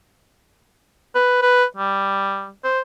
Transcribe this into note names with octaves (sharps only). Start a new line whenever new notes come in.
B4
B4
G3
C5